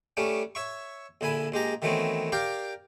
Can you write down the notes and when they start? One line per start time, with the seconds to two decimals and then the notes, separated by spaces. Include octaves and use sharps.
0.17 G3 A3 C#4 D4
0.55 C#5 E5 C#6
1.21 A#1 D3 E4 G#5 B5
1.52 A#1 G#3 G4 A#5
1.82 D#3 E3 F#3 A3 B3 C4
2.32 G4 A#4 D5 F5 G5